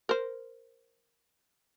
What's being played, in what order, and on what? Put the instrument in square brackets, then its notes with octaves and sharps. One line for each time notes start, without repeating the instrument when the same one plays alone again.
[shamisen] A#4 C5